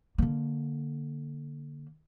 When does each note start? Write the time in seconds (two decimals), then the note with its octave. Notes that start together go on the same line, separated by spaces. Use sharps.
0.18 D3 A#3